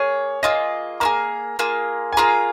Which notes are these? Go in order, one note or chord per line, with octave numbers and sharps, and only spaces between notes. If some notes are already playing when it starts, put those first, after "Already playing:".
Already playing: A#3 G#4 C#5
A#3 F4 G#4 D#5
A#3 F4 G#4 A#5
A#3 F4 G#4
G#5
A#3 F4 G#4 A#5